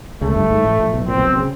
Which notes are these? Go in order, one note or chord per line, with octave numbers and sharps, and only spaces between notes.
C#2 C#3 A3
G1 G2
G#1 G#2
A1 A2
A#1 A#2
B1 B2
A#1 A#2 C4
B1 B2
B1 B2
C#3